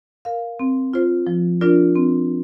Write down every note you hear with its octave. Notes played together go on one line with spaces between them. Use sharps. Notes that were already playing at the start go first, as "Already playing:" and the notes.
A#4 F5
C4
F4 C5
F3
D4 F4 A#4 D5
C4